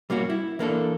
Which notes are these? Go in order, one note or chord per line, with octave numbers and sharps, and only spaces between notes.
G3 A#3 C#4 F#4
E4
E3 A#3 D4 A4